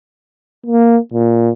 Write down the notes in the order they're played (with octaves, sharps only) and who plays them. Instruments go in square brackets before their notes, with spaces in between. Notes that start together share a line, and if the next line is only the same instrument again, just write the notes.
[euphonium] A#3
A#2